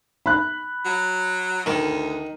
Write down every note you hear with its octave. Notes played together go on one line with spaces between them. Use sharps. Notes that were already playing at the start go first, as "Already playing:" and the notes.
B5 F#6
F#3
D2 D#3